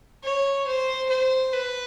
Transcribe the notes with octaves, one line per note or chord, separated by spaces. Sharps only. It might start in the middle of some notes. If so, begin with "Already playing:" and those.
C#5
C5
C5
B4